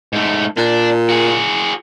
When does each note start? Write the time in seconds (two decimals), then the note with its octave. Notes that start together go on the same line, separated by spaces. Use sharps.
0.13 G#2 A3
0.57 A#2 D4
1.09 F#4 G#4